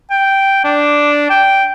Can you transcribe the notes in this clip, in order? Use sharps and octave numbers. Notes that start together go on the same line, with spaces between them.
G5
D4
G5